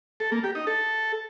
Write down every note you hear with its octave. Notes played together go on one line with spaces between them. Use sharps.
A4
A#3
G4
D#4
A4